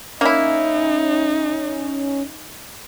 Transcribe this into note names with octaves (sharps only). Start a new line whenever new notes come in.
A#3 C#4 D#4 E4